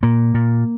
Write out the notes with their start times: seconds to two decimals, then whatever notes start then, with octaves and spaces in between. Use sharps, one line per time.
0.03 A#2 A#3
0.34 A#2